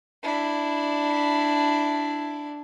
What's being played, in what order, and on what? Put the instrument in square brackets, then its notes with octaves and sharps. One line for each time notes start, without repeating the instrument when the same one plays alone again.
[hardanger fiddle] D4 E4